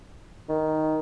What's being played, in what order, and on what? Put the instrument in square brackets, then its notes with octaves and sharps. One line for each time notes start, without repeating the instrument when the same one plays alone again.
[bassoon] D#3